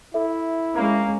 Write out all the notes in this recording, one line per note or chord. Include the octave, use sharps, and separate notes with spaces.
E4 A4 E5
G#3 A#3 C#4